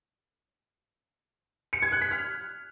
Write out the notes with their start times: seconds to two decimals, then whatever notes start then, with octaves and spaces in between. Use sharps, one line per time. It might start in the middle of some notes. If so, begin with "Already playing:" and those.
1.73 C#7
1.82 G#6
1.92 F#6
2.02 B6
2.11 F6